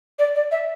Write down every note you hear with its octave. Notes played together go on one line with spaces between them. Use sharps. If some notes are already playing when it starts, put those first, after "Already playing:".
D5
D5
E5